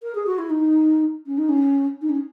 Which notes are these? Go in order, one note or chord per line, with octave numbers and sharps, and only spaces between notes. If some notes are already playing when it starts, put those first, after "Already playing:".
A#4
G#4
F#4
E4
D#4
C#4
D#4
C#4
D#4
C#4